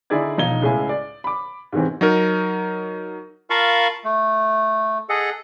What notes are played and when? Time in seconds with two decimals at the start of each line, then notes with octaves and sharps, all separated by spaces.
0.10 D3 D#4 E4 G#4 D5 G#6
0.37 E1 B1 F3 D#4 G#6 G7
0.62 C#2 A2 G#3 E4 G#5
0.89 D5
1.24 B5 D6
1.73 G#2 C3 D#3 E3 C4
2.01 F#3 D#4 A#4
3.50 F4 A#4 F5 A5 B5 C#6
4.04 A3
5.09 G#4 A4 D#5 F#5